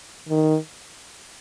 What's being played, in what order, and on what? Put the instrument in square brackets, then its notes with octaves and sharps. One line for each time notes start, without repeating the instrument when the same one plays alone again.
[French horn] D#3